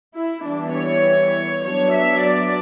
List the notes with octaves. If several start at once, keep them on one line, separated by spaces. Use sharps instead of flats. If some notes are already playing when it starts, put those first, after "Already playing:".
E4
E3 G3 B3 D4
C#5
F#3 B3 D4 C#5
E5
D5